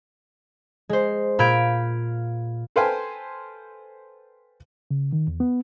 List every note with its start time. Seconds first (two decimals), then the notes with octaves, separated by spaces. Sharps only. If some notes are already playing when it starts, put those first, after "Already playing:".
0.89 G#3 C5
1.39 A#2 B5 F6 G6 G#6 D7
2.76 A4 B4 C5 F5 G5 G#5
4.91 C#3
5.13 D#3
5.28 E2
5.40 B3